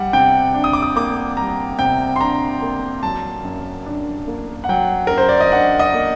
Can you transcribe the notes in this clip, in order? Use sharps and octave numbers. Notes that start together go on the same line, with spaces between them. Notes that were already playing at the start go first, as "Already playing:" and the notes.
Already playing: G3 F#5
C3 G5
D4
D#6
D6
D#6
A#3 D6
G3 A#5
C3 G5
C6
D4 A#5
A#3
F#3 A5
F#2
D4
A#3
F#5
F#3 G5
F#2 A#4
C5
D5
D#5
D4 F#5
D#5
A#3